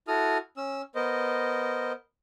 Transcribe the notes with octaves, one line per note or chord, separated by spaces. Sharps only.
E4 F#4 A4 D#6 F6
C#4 E6
B3 A#4 C5 D#5